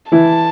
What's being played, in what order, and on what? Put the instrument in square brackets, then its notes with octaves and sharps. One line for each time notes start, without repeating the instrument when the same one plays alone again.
[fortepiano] E3 E4 [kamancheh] A5